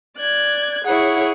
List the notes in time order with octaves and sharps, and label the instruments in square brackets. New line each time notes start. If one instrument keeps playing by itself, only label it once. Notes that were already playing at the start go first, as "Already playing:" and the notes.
[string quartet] D5 F#6 G#6
[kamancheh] E4 F#5 [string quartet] G#4 C#5